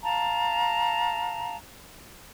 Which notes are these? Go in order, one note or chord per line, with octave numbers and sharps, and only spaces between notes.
F5 A5 A#5